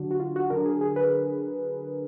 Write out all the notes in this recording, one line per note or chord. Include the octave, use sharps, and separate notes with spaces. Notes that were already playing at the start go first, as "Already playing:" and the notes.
Already playing: D3 F#3 D4
F#4
F4
F#4
D3 F#3 D4 A#4
G#4
G#4
B4